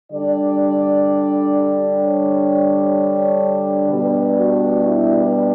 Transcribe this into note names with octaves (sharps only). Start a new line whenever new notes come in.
D3 G3 D4 D5
C#5
B2 G3 D4 B4
F#4
E4
B4